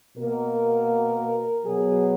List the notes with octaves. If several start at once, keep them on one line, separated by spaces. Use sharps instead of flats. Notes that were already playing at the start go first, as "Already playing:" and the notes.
B2 A#3 A#4
B2 F#3 B3 G#4